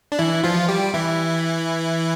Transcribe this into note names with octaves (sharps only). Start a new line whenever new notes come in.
D4
E3 E4
F3 F4
G3 G4
E3 E4